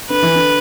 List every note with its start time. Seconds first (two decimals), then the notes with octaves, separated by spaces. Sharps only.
0.10 D3 B4
0.22 E3
0.35 D3